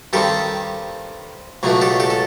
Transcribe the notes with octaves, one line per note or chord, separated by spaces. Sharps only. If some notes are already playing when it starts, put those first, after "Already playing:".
G2 D#3 G3 C4 G4 A4
C#2 B2 F#3 A3 D4
G4 A4
G4 A4
A4